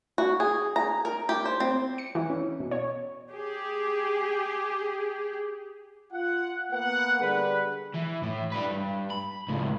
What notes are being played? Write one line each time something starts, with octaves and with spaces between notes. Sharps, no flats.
F#4
G#4
A#5
A#4
G4
C5
C4
C#7
E3
C#4
B2
C#5
G4 G#4
F4 F#5
A#3 B3 B4 F#5
D3 G3 G#4 B4
E3
A2
G3 B4
G2
B5
C#2 A2